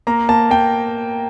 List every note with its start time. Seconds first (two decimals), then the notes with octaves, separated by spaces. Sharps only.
0.07 A#3 A#5
0.29 A#3 A5
0.50 A#3 G5